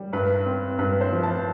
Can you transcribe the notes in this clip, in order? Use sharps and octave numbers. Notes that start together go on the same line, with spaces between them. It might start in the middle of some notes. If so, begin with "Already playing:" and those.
Already playing: G3
G2 B4
C4
G2 B4
C5
F3
A5